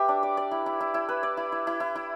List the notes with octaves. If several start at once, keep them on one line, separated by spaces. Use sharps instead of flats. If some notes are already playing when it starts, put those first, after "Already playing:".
Already playing: G4 B4 E5
D4
D5
D5
E4
E4
E4
E4
B4
D5
E4
E4
E4
E4
E4